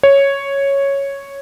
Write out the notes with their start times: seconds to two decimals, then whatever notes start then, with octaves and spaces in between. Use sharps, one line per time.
0.03 C#5